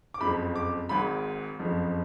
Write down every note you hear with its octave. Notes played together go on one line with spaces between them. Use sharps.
D6
F#1 F2 F3 B5
D6
G#1 G#2 D#3 B5
F#1 F2 F3